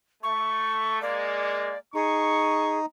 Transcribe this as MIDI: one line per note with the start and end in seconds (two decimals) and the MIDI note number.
0.23 1.00 57
0.23 1.01 85
1.02 1.73 56
1.02 1.73 58
1.02 1.78 74
1.94 2.86 63
1.94 2.79 68
1.94 2.77 85